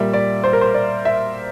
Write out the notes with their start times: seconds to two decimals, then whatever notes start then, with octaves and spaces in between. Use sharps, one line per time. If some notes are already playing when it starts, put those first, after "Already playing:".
Already playing: A#2 G3 E5
0.13 D5
0.44 C5
0.53 A#4
0.61 C5
0.74 D5
1.05 E5